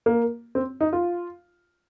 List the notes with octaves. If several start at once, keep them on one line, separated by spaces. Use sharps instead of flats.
A#3
C4
D#4
F4